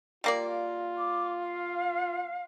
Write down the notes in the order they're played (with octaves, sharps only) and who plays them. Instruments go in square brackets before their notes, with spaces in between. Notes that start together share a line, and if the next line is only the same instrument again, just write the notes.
[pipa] G3 A#3 D5 [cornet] F4
[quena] D6
F5